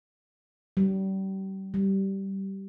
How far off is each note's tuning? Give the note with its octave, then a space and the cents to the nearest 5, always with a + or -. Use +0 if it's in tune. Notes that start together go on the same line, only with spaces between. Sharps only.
G3 -35
G3 -15